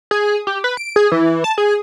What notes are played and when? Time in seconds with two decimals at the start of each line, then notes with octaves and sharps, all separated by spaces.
0.11 G#4
0.47 G4
0.64 B4
0.77 D7
0.96 G#4
1.12 E3
1.44 A5
1.58 G#4